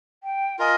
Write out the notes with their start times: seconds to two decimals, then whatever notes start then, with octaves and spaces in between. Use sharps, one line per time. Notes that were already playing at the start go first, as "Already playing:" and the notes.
0.24 G5
0.59 F4 A#4 D#5 G#5